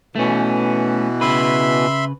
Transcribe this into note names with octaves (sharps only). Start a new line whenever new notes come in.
B2 E3 A3 C#4
C#3 B4 E5 B5 C6